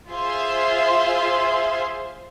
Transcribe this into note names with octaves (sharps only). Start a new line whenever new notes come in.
F4 G#4 C5 E5 F5 C6